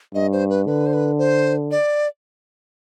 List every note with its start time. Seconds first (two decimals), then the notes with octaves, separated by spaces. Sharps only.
0.14 G2 D#5
0.32 C5
0.50 B4
0.67 D3 B4
0.86 C5
0.93 B4
1.18 C5
1.71 D5